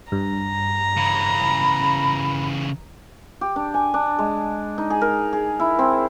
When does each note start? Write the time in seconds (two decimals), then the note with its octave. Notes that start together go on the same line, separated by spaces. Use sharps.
0.12 G2 A#5
0.97 C#3 E3 B5
3.41 G4
3.56 D4
3.74 G#5
3.94 D4
4.19 G#3
4.78 D#4
4.90 G#4
5.01 A#4
5.33 G#4
5.60 E4
5.79 C4